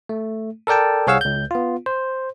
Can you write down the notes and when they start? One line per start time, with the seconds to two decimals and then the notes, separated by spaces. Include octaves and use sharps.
0.09 A3
0.67 A4 A#4 D5 G5 A5
1.07 C2 G#4 C#5 F5 F#5 E6
1.21 C#2 G6
1.51 B3 F4
1.86 C5